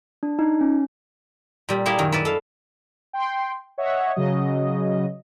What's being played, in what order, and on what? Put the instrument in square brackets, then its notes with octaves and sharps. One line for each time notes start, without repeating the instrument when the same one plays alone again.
[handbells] D4
D#4
C#4
[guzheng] A#2 G3
A#3 E4 G4 G#4
F#2 D#3
E4 B4 D5
A4 F5
[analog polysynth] G5 C6
C#5 D#5 E5 F#5
C#3 F#3 D#5